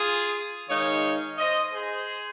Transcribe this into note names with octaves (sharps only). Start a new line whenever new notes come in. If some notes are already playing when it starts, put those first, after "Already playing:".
Already playing: F4 G#4
D#3 G#3 D#4 C#5 F5
C5 D#5
G#4 C5